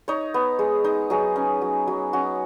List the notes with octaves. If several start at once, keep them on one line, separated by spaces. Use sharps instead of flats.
D#4 C#5
B3
G#3
D#4
F#3 G#4
C#4
F#3
F#3
C#4 F#4